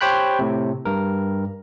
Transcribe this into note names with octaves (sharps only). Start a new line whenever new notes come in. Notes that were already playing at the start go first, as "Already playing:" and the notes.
G4 C5 C#5 G5 B5 F#6
A2 C3
G2 A#4